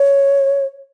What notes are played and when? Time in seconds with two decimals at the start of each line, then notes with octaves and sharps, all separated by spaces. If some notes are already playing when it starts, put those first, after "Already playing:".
Already playing: C#5